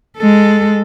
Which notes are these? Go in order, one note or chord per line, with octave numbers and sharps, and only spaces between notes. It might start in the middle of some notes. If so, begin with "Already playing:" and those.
G#3 A4